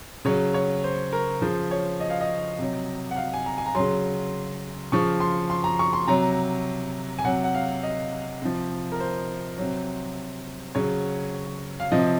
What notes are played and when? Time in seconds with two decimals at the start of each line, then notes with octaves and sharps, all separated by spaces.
0.25 C#3 F#3 C#5
0.54 C#5
0.84 C5
1.13 A#4
1.41 C#3 F3 C5
1.71 C#5
2.00 D#5
2.10 F5
2.21 D#5
2.59 C3 F#3
3.11 F#5
3.16 F5
3.34 G#5
3.46 A#5
3.58 G#5
3.66 A#5
3.75 C#3 F#3 C6
4.92 C#3 F3 C#6
5.20 C6
5.50 C6
5.64 A#5
5.79 C#6
5.93 C6
6.08 C3 F#3 A#5
7.19 G#5
7.25 C3 F#3 F#5
7.44 F#5
7.55 F5
7.83 D#5
8.42 C3 F3
8.92 A#4
9.00 C5
9.58 C3 F#3
10.75 C#3 F#3 C#5
11.80 F5
11.92 C3 F3 D#5